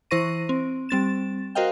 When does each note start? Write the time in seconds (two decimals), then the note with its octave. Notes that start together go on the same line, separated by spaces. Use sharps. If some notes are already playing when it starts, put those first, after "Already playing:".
0.11 E3 E4 C5 C#6 A#6 D#7
0.49 C4
0.89 G3 C4 A6 E7
1.55 F#4 A#4 C5 D#5 F5 G5